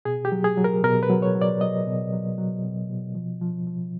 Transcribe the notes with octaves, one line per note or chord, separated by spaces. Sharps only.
B2 G#4
G4
F#3
G#4
F#3
A#4
B2 A#4
B4
F#3
C#5
F#3
D5
F#3 D#5
B2
F#3
F#3
B2
B2
F3
F3
F3